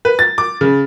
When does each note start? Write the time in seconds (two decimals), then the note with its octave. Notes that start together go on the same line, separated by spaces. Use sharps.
0.05 B4
0.19 A6
0.38 D6
0.61 C#3